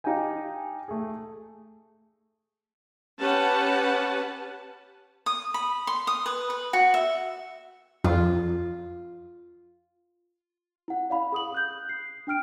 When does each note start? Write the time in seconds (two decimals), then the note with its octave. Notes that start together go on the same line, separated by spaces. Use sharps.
0.04 D#4 G4 F5 G5 G#5
0.88 A3 G#4
3.19 C#4 G4 B4 F#5 A5
5.26 D#6
5.54 B5
5.87 C6
6.07 D#6
6.26 B4
6.50 B4
6.73 F#4
6.94 E5
8.04 F2 F4
10.88 E4 F#5
11.10 D5 F5 B5
11.32 G#4 D#6 F#7
11.52 D#6 F#6 G6
11.89 C7
12.27 D4 G5 F6 D7